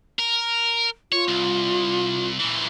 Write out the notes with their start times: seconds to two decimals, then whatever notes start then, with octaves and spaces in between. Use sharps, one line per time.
0.19 A#4
1.12 F4 C#5
1.28 C2
2.40 A#2 E3